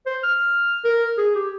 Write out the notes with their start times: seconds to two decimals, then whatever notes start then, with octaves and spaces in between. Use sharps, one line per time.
0.06 C5
0.23 F6
0.85 A#4
1.18 G#4
1.35 G4